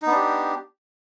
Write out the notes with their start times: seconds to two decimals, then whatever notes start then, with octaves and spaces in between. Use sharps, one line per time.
0.02 D#4
0.07 B3
0.11 D4
0.16 G4